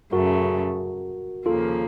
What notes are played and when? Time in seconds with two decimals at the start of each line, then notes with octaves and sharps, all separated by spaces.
0.12 F#2 C#3 A3 F#4 A#4
1.45 D#2 C#3 F3 A#3 F4 A4